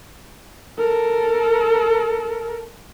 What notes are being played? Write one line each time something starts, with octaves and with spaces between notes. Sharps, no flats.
A4 A#4